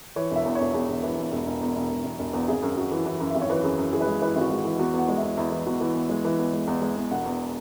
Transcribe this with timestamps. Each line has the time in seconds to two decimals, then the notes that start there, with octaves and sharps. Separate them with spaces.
0.16 E3 C#5
0.31 E1
0.36 E5
0.45 E2
0.55 E1 C#5
0.74 E2 G#4
0.89 E1
1.03 E3
1.18 E2
1.32 E1
1.46 E1
1.61 E2
1.76 E1
1.90 E1
2.04 E1
2.19 E1
2.33 E2
2.48 G#1 G#4
2.62 F#2
2.77 F#2 F#4
2.91 E3
3.06 E3
3.20 F#2
3.30 G#1 E5
3.41 C#5
3.50 E3 B4
3.63 F#2 G#4
3.77 F#2
3.93 E3 G#4
4.01 B4
4.07 G#3 G#4
4.22 E3 B4
4.36 G#1 F#4
4.51 G#3
4.65 E3
4.79 E2 F#4
4.94 E2 F#5
5.09 G#3
5.18 E2 E5
5.37 E2 E4
5.52 E3
5.66 E2 F#4
5.80 E3
5.95 E2
6.09 G#3
6.25 E3
6.39 E2
6.53 G#3
6.67 E2
6.82 G#3
6.96 E2
7.11 E1 F#5
7.26 E2